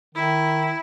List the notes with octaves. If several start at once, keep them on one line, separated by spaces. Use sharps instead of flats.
D#3 E4